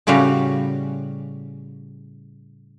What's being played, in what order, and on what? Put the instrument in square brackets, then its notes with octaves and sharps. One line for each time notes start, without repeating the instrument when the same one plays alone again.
[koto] A2 C#3 G3 C#4 F#4 F5